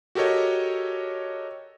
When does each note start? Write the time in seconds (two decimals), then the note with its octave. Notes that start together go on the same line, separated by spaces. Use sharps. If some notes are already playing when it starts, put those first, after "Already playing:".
0.15 F#4 G4 A4 A#4 C#5 D#5